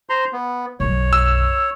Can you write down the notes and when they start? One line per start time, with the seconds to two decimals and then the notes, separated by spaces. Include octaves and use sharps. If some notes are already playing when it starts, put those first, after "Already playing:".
0.09 C5 A#5 C6
0.32 B3
0.80 B1 F#2 C#5
1.13 E6